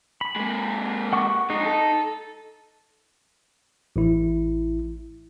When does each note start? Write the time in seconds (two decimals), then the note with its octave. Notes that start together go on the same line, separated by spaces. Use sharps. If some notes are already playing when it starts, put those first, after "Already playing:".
0.21 B5
0.36 G#3 A#3
1.13 F#5 C#6 D6
1.50 F2 G#3 D#4
1.65 A4
3.96 A1 E4